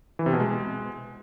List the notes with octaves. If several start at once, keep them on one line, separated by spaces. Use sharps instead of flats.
E3
C3
B2
G#3